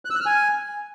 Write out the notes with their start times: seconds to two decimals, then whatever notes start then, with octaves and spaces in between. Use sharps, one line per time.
0.05 F#6
0.10 E6
0.15 F#6
0.21 F6
0.26 G#5